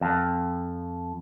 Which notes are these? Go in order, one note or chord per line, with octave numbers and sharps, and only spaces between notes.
F2